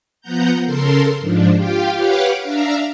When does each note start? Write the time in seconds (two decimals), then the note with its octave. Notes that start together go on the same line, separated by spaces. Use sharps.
0.21 F3 B3 F#5 A#5 G6
0.62 C#3 A4 A#4 C6
1.19 G#2 F3 D4
1.54 F4 G4 F5 G5
1.96 G4 B4 C#5 F5 F#5 D6
2.43 D4 E5 F5 A#5